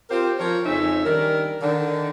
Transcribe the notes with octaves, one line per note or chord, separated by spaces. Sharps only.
C4 F4 G4 A#4 C5
F3 F4 A#4 C#5
F2 C#3 C#4 D#4 E5
D#3 G3 D4 A#4
D3 D#3